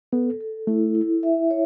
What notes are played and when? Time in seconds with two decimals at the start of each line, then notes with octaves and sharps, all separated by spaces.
0.12 B3 A4
0.40 A4
0.67 A3 E4
0.95 E4
1.23 E5
1.51 C#5